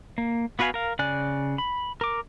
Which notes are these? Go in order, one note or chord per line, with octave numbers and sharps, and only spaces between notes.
A#3
B3 F#4 B4 F5 G#5
A#4 F5
C#3 D5 G#5 F#6
B5
A#4 D6